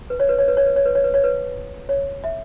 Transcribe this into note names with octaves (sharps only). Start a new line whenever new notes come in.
B4
C#5
B4
C#5
B4
C#5
B4
C#5
B4
C#5
B4
C#5
B4
C#5
E5